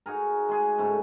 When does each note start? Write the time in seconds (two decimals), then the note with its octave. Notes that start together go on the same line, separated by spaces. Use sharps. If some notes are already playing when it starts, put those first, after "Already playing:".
0.06 D#4 F#4 G#4 A#4
0.49 G#3 G#4
0.78 G#2 C#3 A3